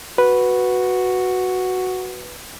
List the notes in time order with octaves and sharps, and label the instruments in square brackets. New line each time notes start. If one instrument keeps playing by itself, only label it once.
[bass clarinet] F#4 [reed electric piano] B4